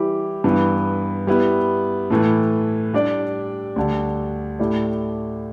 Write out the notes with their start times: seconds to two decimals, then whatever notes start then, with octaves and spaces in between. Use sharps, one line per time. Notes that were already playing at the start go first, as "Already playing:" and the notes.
Already playing: E3 G3 E4 G4
0.44 G2 E3 B3
1.27 G3 B3 E4
2.10 A2 E3 A3
2.93 G3 D4 G4 D5
3.76 D2 D3 G3
4.59 A2 A3 E4 G4 D5